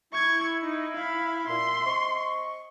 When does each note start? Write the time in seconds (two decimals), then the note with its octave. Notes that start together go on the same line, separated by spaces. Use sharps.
0.13 E4 C#6 G#6
0.63 D#4
0.96 F5 B5
1.48 A#2 E5 C6
1.85 C4 D#5 C#6